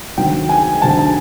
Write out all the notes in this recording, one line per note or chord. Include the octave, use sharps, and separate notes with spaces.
D2 C3 D#3 F#3 G5
G#5
D2 C3 D#3 F#3 A5
A5